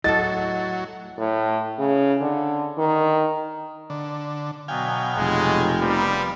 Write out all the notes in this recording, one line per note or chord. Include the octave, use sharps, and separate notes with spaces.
A2 F#3 A4 D#5 A6
A2
C#3
D3
D#3
D3
B2 F#3 B3 F5 G5 G#5
F1 G#3
F3 G3 B3 D#4 A#4 C5